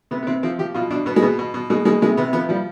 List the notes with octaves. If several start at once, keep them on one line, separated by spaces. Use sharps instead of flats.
C3 B3
B3
C3 C4
F3 C4
F3 G4
B2 F4
B2 D4
B2 B3
G#3
B2 B3
B2
B2
B2 G#3
B2 G#3
C3 G#3
C3 B3
F3 B3
F3 G3